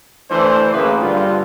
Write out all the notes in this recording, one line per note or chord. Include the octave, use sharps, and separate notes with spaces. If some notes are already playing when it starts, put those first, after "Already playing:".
D2 E3 A3 D4 C5
F#2 A2 C#3 A#3 G#4 B4
G2 D3 F4